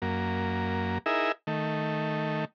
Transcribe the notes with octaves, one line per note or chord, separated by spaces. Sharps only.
F#2 A#3
D#4 E4 G#4 A#4 E5
D#3 A3